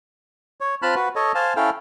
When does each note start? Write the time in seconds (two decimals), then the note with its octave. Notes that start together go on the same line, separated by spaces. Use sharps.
0.61 C#5
0.82 C4 F4 A5 B5 F6 F#6
0.95 F#4 B4
1.16 A4 C#5 D#5
1.35 C5 F5 G#5 A5
1.56 C#4 E4 A4 F5 G5